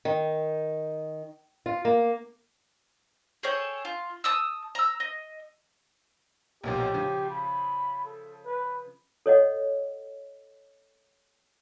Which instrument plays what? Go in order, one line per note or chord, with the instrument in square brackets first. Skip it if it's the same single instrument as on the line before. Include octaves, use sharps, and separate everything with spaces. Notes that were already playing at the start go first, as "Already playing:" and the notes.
[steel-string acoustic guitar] D#3
F4
A#3
[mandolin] G#4 A4 C#5 G5
F4
A5 D#6 E6
A#5 E6
D#5
[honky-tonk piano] B1 A#2 F3 [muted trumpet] G4
[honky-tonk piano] C#3 F3
[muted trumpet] B5
A4
B4
[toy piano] A4 C#5 D#5 F#5